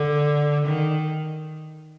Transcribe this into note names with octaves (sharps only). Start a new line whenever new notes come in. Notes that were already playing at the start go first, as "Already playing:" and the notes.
Already playing: D3
D#3